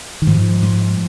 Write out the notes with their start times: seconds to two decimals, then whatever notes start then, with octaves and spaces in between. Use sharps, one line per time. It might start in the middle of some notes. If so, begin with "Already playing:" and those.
0.22 D#3
0.27 G#2 F3
0.62 G#2